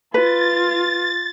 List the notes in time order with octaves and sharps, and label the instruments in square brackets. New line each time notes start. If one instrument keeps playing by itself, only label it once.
[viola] F4 [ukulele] B4 [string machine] A6